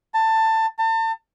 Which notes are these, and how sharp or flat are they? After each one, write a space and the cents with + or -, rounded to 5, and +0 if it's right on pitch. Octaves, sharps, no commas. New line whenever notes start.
A5 +20
A5 +35